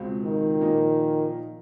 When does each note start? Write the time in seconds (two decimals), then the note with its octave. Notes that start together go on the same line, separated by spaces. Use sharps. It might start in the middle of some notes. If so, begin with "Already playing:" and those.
Already playing: C#2 B2 G#3 C4 F4
0.23 D#3
0.61 A#2 F3 A#3 D#4